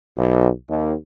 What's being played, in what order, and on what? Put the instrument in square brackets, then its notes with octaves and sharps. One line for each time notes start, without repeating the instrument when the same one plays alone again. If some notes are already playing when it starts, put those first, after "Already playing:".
[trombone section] B1
D#2